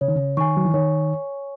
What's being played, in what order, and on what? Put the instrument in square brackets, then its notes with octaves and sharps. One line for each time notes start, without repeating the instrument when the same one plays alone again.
[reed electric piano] C#3 [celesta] C#5
[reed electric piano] D#3
C#3
[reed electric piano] D#3 [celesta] G#5 C#6
[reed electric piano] F#3
E3
[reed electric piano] D#3 [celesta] C#5